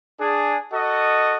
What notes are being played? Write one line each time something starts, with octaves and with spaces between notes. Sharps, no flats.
D4 G#4
F#4 A4 D#5